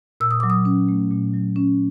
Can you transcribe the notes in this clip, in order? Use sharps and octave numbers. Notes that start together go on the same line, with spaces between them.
A#2 E6
D#6
F#3 D6
D#6
C#4
A3
A#2
F#3
C#4